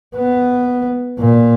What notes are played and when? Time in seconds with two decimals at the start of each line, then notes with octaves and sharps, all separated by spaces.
0.16 B3
1.18 A#2